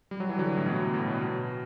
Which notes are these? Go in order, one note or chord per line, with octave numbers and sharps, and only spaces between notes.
G3
F#3
E3
D3 F#3
A2
B2
B2
A2
B2
B2